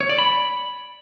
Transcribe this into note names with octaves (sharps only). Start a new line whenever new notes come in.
C#5
D5
B5